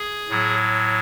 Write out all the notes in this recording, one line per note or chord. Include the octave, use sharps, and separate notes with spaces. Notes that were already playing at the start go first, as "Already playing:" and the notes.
Already playing: G#4
A2 F#3